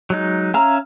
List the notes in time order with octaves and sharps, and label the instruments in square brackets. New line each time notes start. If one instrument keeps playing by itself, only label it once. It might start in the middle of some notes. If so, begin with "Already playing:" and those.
[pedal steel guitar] F#3 G#3 D#4
[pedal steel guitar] C#4 E5 F5 [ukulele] A#5